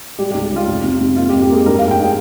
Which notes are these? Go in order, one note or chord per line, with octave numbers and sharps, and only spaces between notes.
G3 G4
G4
C#2
G4
G3 F4
F1
C3
C3
A#3 F4
G4
F2
G4
A#3 G#4
G2 A#4
F5
G2
G5
G#4